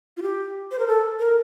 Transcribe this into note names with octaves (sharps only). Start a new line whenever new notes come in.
F4
G4
C5
A#4
A4
A#4